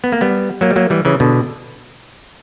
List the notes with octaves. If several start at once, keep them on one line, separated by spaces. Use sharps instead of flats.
B3
A#3
G3 B3
F#3 A#3
G3
F#3 A#3
E3 G3
C#3 E3
B2 D3